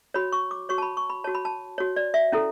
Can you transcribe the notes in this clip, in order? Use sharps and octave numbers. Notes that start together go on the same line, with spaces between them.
F#4 C#5 B5
C#6
D6
F#4 C#5 C#6
A5
B5
C#6
B5
F#4 C#5 A5
B5
A5
F#4 C#5
D5
E5
C#4 E4 A4